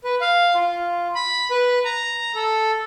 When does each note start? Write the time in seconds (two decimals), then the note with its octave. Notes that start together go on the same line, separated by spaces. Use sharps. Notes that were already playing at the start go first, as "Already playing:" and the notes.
0.04 B4
0.21 F5
0.55 F4
1.15 B5
1.51 B4
1.85 A#5
2.35 A4